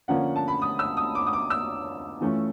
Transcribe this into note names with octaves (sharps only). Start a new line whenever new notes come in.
D3 F3 A#3 C#4 F#5
A5
B5
D#6
E6
D#6
D6
D#6
D6
E6
E3 A3 C#4 F4